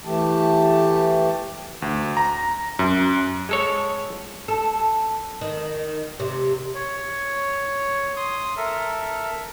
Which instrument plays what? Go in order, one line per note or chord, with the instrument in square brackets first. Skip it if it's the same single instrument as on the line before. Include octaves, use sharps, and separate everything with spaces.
[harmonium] E3 A3 G4 A5
[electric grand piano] D2
A#5
F#2
[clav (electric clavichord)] G#3 A4 C#5
[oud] A4
D#3
C3
[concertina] C#5
C6 D#6
A4 A#4 E5